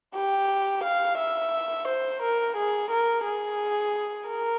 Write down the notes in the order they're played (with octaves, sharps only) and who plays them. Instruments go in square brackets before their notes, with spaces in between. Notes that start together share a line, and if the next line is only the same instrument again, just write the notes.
[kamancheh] G4
F5
E5
C5
A#4
G#4
A#4
G#4
A#4